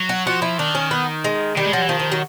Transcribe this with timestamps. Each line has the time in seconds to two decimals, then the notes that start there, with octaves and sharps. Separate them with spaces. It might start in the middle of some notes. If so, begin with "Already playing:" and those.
Already playing: F#3
0.09 F#4
0.26 F3 F#4
0.42 E4
0.58 D#3 D4
0.75 C#4
0.91 B3
1.24 G#3
1.56 D#3 G3
1.65 G#3
1.72 F3 F#3
1.82 E3
1.89 D#3 F3
2.00 F3
2.12 F#3